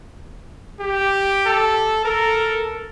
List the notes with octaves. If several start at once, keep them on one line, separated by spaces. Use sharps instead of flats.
G4
A4
A4 A#4